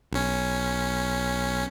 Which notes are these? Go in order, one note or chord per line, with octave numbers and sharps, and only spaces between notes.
B1 C#4